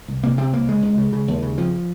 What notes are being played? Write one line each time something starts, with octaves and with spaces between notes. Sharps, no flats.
C2
C3 A#3
C3 C4
C2 A#3
C#3 G#3
C#2
C#3
C#3
D#2
C#3
F2 F3